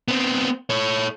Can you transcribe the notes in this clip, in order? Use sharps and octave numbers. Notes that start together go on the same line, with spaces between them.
B3 C4
A4 C#5